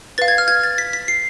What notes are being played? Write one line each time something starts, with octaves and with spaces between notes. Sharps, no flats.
B4 F5 A6
G#6
F6
G#6
A6
B6
B6
C7